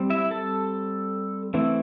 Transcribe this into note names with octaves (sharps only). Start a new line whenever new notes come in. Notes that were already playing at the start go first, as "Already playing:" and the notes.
Already playing: G3 C4
E4 E5
A4 A5
E3 A3 C4 E4